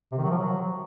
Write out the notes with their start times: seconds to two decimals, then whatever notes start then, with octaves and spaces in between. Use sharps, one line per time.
0.12 C3
0.18 D#3
0.24 F#3
0.30 F3
0.36 F#3